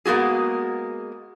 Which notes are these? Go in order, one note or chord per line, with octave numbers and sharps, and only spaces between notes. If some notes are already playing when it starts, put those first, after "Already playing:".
G#3 A#3 B3 F#4 G#4